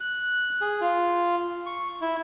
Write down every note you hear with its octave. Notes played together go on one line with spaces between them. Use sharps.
F#6
G#4
F4
C#6
E4